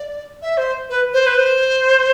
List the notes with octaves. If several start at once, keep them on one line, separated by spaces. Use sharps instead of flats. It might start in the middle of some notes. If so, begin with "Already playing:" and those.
Already playing: D5
E5
C5
B4
C5
B4
C5